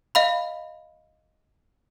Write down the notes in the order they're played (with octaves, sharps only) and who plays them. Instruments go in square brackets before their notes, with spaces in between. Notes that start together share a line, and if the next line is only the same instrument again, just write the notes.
[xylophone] D#5 F5 B5